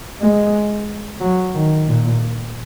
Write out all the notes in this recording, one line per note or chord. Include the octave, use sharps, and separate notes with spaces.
G#3
F#3
D#3
A#2